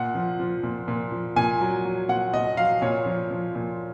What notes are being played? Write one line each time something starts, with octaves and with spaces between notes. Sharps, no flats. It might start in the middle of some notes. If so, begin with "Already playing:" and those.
Already playing: A#2 F#5
F3
F3
A#2
A#2
F3
A#2 G#5
F#3
F#3
A#2 F#5
A#2 D#5
F#3 F5
A#2 C#5
F3
F3
A#2